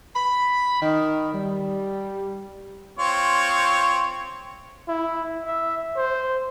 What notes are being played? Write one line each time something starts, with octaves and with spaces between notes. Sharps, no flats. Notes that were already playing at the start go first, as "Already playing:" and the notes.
B5
D#3
G3
C4 F4 C#5
E4
E5
C5